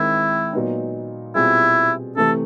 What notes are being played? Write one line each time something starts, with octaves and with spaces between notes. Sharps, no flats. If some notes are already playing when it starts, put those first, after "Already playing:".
Already playing: D#3 G#3 C4 E4
A#2 F#3 B3 D#4
B2 G3 C4 E4 F4 G#4
C3 E3 A3 A4